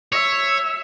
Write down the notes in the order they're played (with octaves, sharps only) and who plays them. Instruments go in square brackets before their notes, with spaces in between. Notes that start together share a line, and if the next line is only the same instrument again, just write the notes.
[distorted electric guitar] C#5 [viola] E5